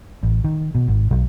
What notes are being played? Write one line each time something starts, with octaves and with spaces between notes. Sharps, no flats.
A1
D#3
B2
G#1
B1